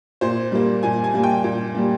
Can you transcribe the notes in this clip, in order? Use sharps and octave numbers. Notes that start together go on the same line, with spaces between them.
A#2 C5
G3 A#3
A#2 G#5
G#5
G3 A#3
G5
A#2
G3 A#3